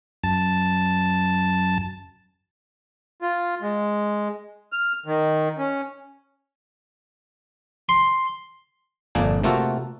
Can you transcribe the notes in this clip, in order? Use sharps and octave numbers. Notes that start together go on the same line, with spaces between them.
F#2 A5
F4
G#3
F6
D#3
C#4
C6
G1 F2 A#2 A#3 D4 G#5
C3 A3 A#3 F4 F#4 A4